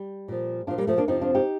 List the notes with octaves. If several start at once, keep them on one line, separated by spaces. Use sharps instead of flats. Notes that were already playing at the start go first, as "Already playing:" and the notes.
Already playing: G3
A#2 F3
A#2 F3 D4 F4
G3 A#3
F3 A3
A#3 D4
F2 C3 F3 C4 D#4
D4 F4
D#4 G4